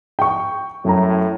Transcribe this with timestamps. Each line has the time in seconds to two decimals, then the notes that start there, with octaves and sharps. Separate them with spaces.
0.19 G5 C#6
0.85 F#2 A2 A#5